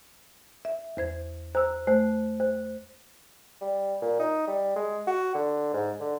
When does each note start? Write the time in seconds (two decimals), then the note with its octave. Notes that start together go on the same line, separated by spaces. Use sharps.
0.65 E5
0.97 E2 C5 G#6
1.55 C5 A#5 E6
1.87 A3 C5
2.40 C5
3.61 G3
4.02 A#2
4.19 D#4
4.47 G3
4.76 G#3
5.07 F#4
5.34 D3
5.73 G#2
6.00 D3